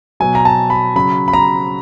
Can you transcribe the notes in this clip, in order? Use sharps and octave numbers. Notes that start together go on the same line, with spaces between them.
B2 F#3 G#5
A#5
A5
B5
C#3 F#3 B5
B5
A#5